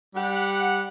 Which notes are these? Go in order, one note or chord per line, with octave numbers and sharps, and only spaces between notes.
G3 G4 F#5